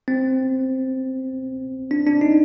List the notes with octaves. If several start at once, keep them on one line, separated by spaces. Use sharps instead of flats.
C4
D4
D4
D#4